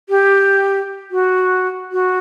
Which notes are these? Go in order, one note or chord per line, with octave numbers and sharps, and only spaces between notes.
G4
F#4
F#4